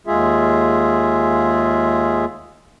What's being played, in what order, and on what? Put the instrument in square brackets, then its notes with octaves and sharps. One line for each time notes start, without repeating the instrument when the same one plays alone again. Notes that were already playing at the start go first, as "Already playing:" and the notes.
[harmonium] D#2 G#3 F4 G#4 E5